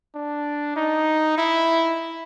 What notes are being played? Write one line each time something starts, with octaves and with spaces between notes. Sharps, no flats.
D4
D#4
E4